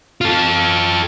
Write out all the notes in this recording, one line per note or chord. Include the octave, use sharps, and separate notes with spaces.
F4 A4